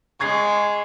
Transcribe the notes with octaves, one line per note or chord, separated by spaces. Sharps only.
G#3 C#6 G#6 C7